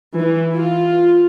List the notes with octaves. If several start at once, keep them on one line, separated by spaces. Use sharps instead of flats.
E3
F4